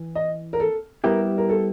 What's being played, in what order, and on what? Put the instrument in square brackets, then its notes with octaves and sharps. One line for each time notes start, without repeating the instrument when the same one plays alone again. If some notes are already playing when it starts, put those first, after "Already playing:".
Already playing: [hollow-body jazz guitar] E3
[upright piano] D#5
A#4
A4
[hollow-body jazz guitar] G3 B3 E4 G4 [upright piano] A#4
[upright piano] A#4
A4